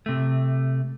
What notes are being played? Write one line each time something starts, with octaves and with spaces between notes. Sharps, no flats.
C3 A3